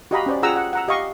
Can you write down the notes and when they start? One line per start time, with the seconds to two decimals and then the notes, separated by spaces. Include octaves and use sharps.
0.11 F#4 G4 D#5 F5 A#5 B5
0.26 C#4 C5 D5
0.42 F4 G#4 F#5 G5 A#5 E6
0.56 F#5
0.73 F#5 A#5 E6
0.88 G4 D#5 F5 C#6